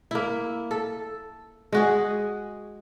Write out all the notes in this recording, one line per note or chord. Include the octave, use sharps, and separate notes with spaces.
A#3 E4
A4
G#3 F#4 G#4